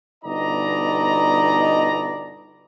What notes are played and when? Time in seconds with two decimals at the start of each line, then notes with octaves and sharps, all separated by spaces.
0.24 G1 B2 D#4 D5 D#5 A#5